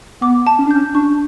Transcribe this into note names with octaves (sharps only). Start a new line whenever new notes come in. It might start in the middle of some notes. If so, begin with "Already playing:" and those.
B3 D6
A5
C#4
D4
C#4 G6
D4 C#6